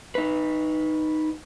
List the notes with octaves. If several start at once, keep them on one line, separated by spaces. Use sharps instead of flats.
D#4 B4